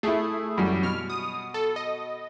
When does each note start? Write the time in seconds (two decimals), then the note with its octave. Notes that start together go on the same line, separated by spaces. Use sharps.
0.03 A3 E4 G#4
0.58 F#2 E3 G3
0.83 B2 F6
1.10 D#6
1.54 A4
1.76 D#5